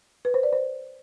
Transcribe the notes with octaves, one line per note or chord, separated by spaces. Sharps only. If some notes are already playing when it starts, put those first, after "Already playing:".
B4
C5
D5
C5